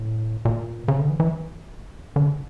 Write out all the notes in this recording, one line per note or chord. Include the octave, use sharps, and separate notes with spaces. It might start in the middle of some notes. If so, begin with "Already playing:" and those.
Already playing: A2
A#2
C#3
D3
E3
E3
D3
C#3